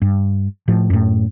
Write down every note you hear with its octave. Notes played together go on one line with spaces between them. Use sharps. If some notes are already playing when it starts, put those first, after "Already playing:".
G2
A2 F3
F#2 A2